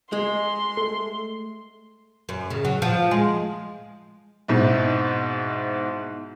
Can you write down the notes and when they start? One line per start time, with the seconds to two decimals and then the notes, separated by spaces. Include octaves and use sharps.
0.13 G#3 C6
0.77 A3
2.29 F#2
2.50 C#3
2.65 F#3
2.82 F3
3.11 G#3
4.48 G#2 B2 C4 E4